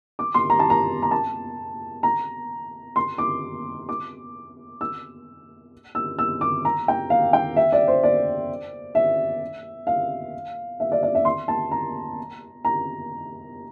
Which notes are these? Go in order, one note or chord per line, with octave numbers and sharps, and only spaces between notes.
D6
C6
A#5
A5
A#5
A#5
A5
A#5
C6
D6
D6
E6
E6
E6
D6
A#5
G5
F5
G5
E5
D5
C5
D5
E5
F5
E5
D5
D5
E5
C6
A5
A#5
A#5